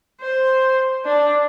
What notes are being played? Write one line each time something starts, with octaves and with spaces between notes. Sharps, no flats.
C5
D4